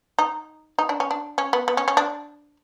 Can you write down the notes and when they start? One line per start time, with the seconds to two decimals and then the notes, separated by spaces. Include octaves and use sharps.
0.19 D#4
0.79 D#4
0.89 D4
1.00 C#4
1.11 D4
1.38 C#4
1.53 B3
1.68 B3
1.77 C#4
1.88 C#4
1.97 D4